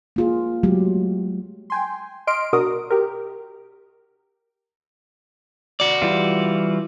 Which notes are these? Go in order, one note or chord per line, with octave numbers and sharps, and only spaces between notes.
A#3 F4 G#4
F#3 G#3 A3 G4
G5 G#5 C6
D#5 C6 F6 D7
B2 D4 F#4 A#4 D#6
G4 A#4
F#4 D5
E3 G3 F4